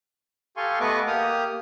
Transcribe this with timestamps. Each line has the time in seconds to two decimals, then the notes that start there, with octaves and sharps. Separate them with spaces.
0.57 G4 A4 F5 G#5 C6 C#6
0.80 A3 B3 B4 D#5 C#6 D6
1.07 A#3 G4 D#6 F6